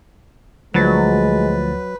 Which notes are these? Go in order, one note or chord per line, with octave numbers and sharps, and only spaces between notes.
D2 F3 F#3 G#3 B4 A6